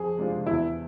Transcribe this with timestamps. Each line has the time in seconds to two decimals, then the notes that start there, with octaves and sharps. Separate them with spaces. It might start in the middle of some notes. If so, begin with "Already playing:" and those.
Already playing: F2 G#4
0.17 C3 G#3 D4 F4
0.46 E2 E4